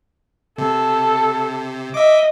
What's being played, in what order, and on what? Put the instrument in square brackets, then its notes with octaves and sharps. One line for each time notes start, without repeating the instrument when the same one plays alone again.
[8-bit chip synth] C3 [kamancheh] A4
[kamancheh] D#5 [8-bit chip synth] E5 D6